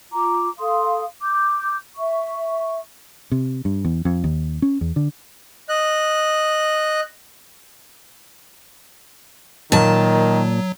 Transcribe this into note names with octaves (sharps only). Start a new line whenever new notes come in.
F4 A#5 D6
A4 F5 C6 D#6
D6 G6
E5 C#6
C3
G2
E2
F2
D#2
C#4
E2
D3
D#5 F#6
A#2 D#3 F#3 A5